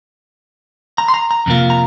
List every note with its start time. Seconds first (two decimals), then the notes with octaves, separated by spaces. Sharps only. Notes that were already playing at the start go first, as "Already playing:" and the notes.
0.98 A#5
1.08 C6
1.14 A#5
1.31 A#5
1.46 F2 C3 A#3 F4
1.70 A#5